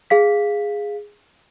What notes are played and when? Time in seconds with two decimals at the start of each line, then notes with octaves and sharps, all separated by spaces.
0.10 G#4 F5 B6